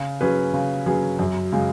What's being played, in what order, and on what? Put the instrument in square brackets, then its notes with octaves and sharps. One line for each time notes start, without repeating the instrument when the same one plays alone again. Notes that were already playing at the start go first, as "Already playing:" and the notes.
Already playing: [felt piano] C#3
F#3 C#4 G#4 B4
C#3
F#3 C#4 G#4 B4
F#2
C#3 G#3